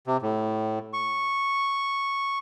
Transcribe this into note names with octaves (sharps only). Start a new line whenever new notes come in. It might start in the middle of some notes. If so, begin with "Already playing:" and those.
C3
A2
C#6